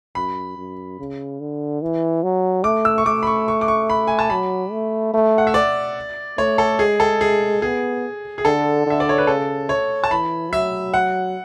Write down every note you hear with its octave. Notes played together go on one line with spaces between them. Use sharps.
F#2 B5
F#2
C#3
D3
E3
F#3
A3 D6
E6
C#6
A3 D6
B5
C#6
C#6
D6
C#6
B5
G#5
A5
F#3 B5
A3
A3
F#5
E5
D5
A3 C#5
A4
G#3 G#4
A4
G#4
B3 G#4
G#4
D3 A4
D3 E5
D5
C#5
B4
C#3 A4
C#5
A5
E3 B5
F#3 E5
F#5